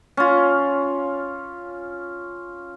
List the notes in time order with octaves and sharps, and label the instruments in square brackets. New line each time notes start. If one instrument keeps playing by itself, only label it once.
[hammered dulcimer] C#4 F4